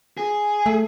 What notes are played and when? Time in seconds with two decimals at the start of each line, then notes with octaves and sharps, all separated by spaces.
0.18 G#4
0.66 A3